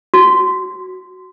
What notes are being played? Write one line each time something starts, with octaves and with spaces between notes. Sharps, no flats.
F#4